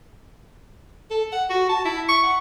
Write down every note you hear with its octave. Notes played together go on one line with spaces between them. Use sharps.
A4
F#5
F#4
A5
E4
C#6
F#5